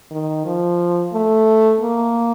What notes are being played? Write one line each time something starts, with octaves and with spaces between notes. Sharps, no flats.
D#3
F3
A3
A#3